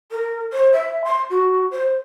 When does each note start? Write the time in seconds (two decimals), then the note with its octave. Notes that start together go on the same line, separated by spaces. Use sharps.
0.11 A#4
0.52 C5
0.72 E5
1.04 C6
1.30 F#4
1.71 C5